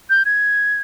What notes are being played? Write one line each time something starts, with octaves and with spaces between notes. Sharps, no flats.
G6
G#6